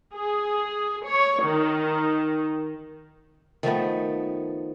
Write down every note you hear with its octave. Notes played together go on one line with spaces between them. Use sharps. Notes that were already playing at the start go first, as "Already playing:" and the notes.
G#4
C#5
D#3
D#3 F3 A3 B3